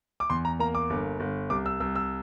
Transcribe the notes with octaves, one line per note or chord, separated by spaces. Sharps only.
D6
E2 C6
A#5
A#3 A#5
D6
G1
G1
C2 D6
E6
C2 E6
E6